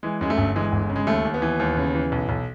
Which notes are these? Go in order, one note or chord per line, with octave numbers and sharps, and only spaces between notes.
E3 G#3
F#2 G#3
A3
G1
E3 G#3
G1
C#3
G#3
D#2 A3
D#2
B3
E3
D#2
C#3
E3
B1
B1